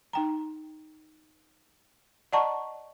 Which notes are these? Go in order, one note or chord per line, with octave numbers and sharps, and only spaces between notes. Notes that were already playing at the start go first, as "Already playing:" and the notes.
D#4 G5 A#5
D5 D#5 F#5 A5 A#5 C#6